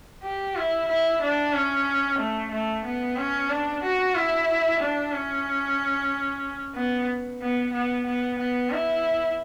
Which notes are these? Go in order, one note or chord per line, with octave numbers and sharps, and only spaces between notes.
G4
E4
E4
D4
C#4
A3
A3
B3
C#4
D4
F#4
E4
D4
C#4
B3
B3
B3
B3
B3
E4